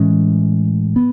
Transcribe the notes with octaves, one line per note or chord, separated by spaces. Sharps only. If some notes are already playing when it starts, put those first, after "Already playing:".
Already playing: A2 E3 G#3 C#4
B3